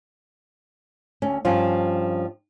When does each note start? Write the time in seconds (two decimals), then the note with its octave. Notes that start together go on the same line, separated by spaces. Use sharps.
1.22 D2 C#4
1.45 G2 F3 C#4 F4